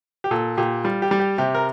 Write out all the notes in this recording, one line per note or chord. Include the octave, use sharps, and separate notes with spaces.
G4
A#2 A4
A#2 G4
G3 F4
G4
G3
G4
C3 G4
A#4